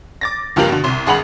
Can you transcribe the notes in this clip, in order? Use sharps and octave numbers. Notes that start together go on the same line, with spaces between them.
D6 A6 A#6
C#2 G2 F3 A#3 G4 F#7
B2 D3
C2 C6
G#1 G2 G#4 F#5 B5 F#7